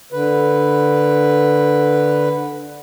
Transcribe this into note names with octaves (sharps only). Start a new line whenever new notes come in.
D3 B4